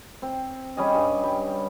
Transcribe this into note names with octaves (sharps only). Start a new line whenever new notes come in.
C4
G3 C#4 G#4 D#5
G2
G3